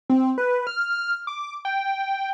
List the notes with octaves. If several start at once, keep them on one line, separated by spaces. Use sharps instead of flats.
C4
B4
F6
D6
G5